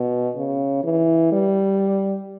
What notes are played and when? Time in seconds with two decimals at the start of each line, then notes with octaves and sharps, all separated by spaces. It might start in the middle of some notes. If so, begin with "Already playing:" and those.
Already playing: B2
0.35 C#3
0.83 E3
1.32 G3